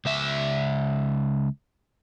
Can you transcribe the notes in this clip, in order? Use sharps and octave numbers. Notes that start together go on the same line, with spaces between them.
C#2 E5